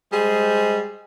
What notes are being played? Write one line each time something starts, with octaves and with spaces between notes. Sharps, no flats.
G3 G#3 G#4 C5